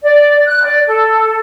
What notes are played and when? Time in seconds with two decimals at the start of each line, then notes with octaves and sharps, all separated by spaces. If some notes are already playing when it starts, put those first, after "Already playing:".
0.04 D5
0.47 F#6
0.64 D5
0.88 A4